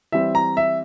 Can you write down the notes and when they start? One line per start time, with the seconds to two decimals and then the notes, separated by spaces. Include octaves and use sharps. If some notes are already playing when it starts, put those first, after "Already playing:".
0.12 E3 G3 C4 E5
0.35 A#5
0.57 E5